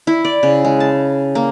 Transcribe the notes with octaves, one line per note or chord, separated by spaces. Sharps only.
E4
D5
C#3
G#3
A5
A#3